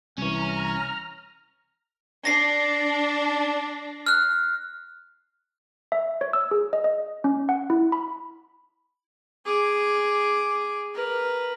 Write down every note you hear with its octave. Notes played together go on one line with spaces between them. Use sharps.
C2 E3 C#4 C#5 A#5 F6
D4 A#6 C7
F6 F#6
E5
C#5
E6
G#4
D#5
D#5
C#4
F#5
E4
B5
G#4 D6
A#4 B4